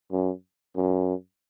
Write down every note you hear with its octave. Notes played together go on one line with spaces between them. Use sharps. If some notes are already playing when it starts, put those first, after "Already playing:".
F#2
F#2